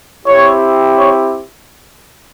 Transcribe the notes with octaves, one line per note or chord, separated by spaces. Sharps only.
C4 E4 G4 C#5
C#5